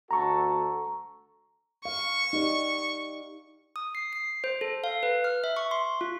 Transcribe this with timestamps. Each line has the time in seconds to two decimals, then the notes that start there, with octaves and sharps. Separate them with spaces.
0.11 D2 F#4 A4 A#5 C#6
1.85 F5 C#6
2.33 D#4 G4 D5
3.76 D#6
3.95 C7
4.13 C7
4.44 C5
4.61 A4
4.84 F5
5.03 B4
5.24 F6
5.44 E5
5.57 C#6
5.71 C6
6.01 F4